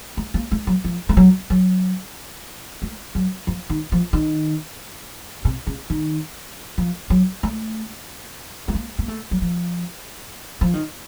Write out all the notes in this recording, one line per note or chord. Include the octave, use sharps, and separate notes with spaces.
A3
A#3
A3
F#3
F3
A3
F#3
F#3
A3
F#3
F3
D#3
F3
D#3
C3
C#3
D#3
F3
F#3
A3
A3
A#3
A#3
A3
F#3
F3
F3
D#3